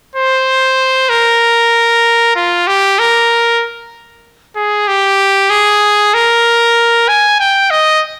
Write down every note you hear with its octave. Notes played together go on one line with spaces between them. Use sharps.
C5
A#4
F4
G4
A#4
G#4
G4
G#4
A#4
G#5
G5
D#5